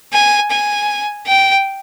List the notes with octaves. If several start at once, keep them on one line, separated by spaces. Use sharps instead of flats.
G#5
G#5
G5